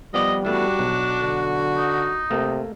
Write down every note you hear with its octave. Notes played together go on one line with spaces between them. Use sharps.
F3 G3 B3 D5 D#5
E3 A3 B3 D4 F#4
B1
D3
D#4
C3 A3 A#3